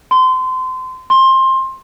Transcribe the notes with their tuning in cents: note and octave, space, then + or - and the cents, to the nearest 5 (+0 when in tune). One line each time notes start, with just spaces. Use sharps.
C6 -25
C6 +20